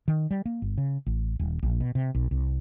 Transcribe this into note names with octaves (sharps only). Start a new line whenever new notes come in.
D#3
G3
A#3
G1
C#3
A1
D#1
A#1
B2
C3
B1
C2